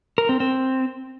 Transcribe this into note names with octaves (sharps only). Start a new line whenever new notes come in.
A#4
C4
C4